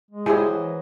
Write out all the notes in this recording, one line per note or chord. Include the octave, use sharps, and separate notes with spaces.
G#3
F#3 E4 G4 G#4 C5 D#5
E3